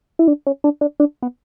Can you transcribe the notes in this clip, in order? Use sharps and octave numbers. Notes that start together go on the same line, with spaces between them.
E4
D4
C#4
D4
D4
D4
B3